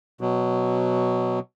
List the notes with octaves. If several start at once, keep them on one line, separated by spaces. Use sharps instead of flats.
B2 F#3